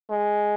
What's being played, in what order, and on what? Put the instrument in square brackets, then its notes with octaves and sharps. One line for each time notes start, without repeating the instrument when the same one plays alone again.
[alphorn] G#3